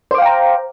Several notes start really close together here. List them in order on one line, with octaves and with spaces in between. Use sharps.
C5 D6 F5 G5 A#5